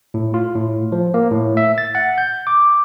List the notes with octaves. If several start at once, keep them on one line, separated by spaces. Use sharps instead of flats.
A2
F4
A2
F3
A#3
A2
E5
A6
F#5
G6
D6